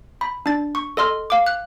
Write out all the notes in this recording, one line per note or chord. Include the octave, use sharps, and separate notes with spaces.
B5
D4 A6
C#6
A4 D#5 C6 F6
F5 D6
F#6